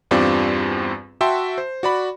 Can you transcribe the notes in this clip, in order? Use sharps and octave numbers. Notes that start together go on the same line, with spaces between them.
E2 G2 C4 F4 G4 D5
F#4 E5 G5 A5 C6
C5
F#4 D5 B5